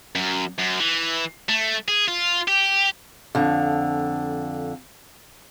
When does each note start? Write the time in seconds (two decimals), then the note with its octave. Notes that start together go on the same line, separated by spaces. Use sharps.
0.15 F#2
0.58 F#2
0.80 E3
1.49 A3
1.88 G#4
2.08 F4
2.48 G4
3.35 F2 D3